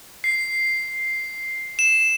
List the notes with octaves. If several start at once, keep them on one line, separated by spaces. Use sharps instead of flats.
C7
E7